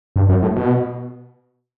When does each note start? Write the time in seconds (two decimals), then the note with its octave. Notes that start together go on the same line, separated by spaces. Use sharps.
0.16 G2
0.29 F#2
0.42 A2
0.56 B2